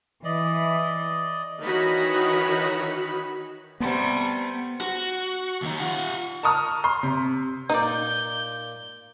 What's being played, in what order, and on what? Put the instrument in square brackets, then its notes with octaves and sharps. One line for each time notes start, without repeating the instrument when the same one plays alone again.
[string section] E3 [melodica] D5 D#5
[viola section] D#3 E3 D#4 F#4 C#5 B5
[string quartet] C3 G3 A3 [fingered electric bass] B3
[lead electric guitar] F#4
D#2 D#3
F4 F#5
[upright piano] A5 A#5 C#6 D#6 F6
C6
C3
[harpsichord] A#2 F4 D5 [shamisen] D#4 [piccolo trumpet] G6